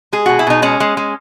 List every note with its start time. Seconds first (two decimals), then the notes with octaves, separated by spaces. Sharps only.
0.13 G#3 G#4
0.26 B2 F#4
0.39 E4
0.47 B2 D#4
0.62 G#3 C#4
0.80 G#3
0.97 G#3